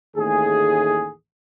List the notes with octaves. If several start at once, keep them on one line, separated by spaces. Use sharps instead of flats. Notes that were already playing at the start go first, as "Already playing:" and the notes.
A1 D#2 A3 G#4